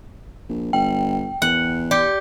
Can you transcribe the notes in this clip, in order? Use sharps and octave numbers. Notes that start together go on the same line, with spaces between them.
A#1
G1 G5
E2 F#5
G4 D5